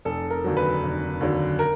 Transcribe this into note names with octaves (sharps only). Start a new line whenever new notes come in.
F1 A4
A#4
D#2 D3 F#3
B4
F1
D#2 D3 F#3
A#4